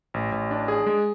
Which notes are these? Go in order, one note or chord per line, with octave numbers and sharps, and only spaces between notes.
A1
A1
D4
G#4
G#3